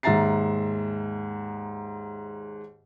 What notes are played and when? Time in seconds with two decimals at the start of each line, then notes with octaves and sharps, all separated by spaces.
0.03 D#2 G#2 E5 A#5 A6 C7